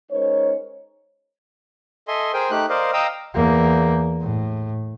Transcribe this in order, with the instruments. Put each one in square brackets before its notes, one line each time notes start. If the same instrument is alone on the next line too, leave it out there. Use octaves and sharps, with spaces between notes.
[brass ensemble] G#3 C#4 D#4 A#4 C5 C#5
[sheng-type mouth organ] A4 D#5 E5 G#5 C6
G#4 A#4 C5 G5 G#5
A3 D#4 G4 F#6
A#4 C5 D5 D#5 F5
D#5 F5 G5 A#5 D#6 E6
[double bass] E2 A#3
A2